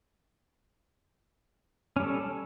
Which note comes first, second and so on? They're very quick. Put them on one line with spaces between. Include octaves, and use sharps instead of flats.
C#4 G3 A4